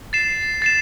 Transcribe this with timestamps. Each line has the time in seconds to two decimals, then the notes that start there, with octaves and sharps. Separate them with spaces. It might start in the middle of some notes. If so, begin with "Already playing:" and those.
0.13 A6 C7 E7
0.62 A6 C7 E7